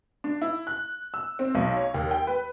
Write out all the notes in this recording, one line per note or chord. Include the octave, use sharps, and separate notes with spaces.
D4
E4
F#6
E6
C4
B1
C#5
D#2
G5
B4